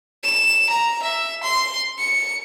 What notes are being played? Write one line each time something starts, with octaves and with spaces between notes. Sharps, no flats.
E7
A#5
E5
C6
C#7